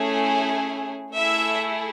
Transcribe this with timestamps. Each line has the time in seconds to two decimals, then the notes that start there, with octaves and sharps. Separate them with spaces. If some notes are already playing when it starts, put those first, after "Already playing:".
Already playing: A3 C#4 E4 G#4
1.16 A3 E4 G#4 E5